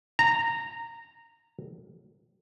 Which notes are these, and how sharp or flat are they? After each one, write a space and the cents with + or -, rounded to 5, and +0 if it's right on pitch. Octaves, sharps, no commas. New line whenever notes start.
A#5 -15